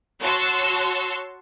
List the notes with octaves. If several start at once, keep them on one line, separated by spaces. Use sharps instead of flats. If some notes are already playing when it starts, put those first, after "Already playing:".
F#4 C#5 A5 C6 C#6 E6